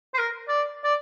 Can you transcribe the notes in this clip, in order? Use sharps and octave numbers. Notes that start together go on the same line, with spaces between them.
C5
A#4
D5
D5